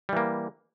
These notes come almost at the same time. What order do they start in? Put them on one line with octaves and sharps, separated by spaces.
G3 E3 A#3